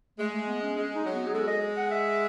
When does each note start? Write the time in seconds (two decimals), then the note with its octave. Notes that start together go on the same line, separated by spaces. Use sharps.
0.19 G#3 A3
0.33 A3
0.47 B3
0.62 C#4
0.76 G#3 C#4
0.95 D#4
1.05 F#3
1.15 B3
1.27 G#4
1.33 G#3 A4
1.47 D#5
1.77 F#5
1.91 E5